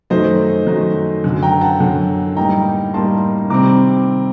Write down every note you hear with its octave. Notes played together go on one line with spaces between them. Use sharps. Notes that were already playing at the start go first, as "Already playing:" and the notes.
F#2 D#3 F#3 A3 D#4 C5 D#5
F#2 D#3 F#3 A3 D#4
F#2 D3 F#3
G5 A#5
F#5 A5
F#2 D3 F#3
A2 G3 A#3 D#4 G5 A#5
A2 G3 A#3 D#4 A5 C6
C3 D#3 G3 C4 A#5 D6